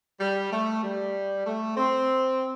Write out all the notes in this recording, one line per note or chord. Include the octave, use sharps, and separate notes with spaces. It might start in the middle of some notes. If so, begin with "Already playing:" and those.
G3
A3
G3
A3
C4